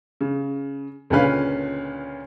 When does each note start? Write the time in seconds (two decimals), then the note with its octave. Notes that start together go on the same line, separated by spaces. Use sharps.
0.21 C#3
1.10 C#2 A#2 D3 C#4 B4 F5